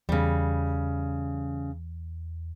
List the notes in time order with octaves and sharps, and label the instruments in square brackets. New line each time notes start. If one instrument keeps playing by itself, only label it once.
[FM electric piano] E2 [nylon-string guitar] C#3 G3